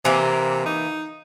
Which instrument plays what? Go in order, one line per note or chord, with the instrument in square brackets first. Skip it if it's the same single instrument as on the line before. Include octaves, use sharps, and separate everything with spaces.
[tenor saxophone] C3 [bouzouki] E3 A#3
[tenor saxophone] D#4